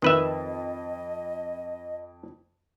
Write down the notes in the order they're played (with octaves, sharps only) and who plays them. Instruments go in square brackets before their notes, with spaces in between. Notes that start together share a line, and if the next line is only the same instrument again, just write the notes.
[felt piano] F2 [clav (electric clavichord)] D#3 B4 E5 [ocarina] D#5